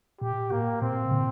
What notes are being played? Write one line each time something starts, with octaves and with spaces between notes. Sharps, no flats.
A#2 G4
A2 A#3
A#2 C4
C3
A#2 D3